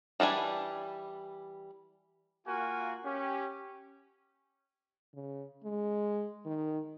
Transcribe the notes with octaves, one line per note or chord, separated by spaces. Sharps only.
E3 G3 D4 G#5
A#3 F4 F#4 A#4 F5 G#5
C#4 G4
C#3
G#3
D#3